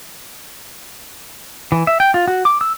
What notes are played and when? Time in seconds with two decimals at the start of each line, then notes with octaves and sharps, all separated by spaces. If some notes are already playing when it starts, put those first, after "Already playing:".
1.72 E3
1.87 E5
2.00 G5
2.14 F4
2.28 F#4
2.45 D6
2.61 E6